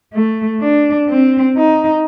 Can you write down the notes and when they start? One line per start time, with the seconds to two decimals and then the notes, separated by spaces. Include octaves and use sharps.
0.14 A3
0.61 D4
1.09 C4
1.57 D#4